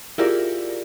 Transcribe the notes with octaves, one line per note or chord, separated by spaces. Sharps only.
E4 F4 G4 G#4 A#4 D5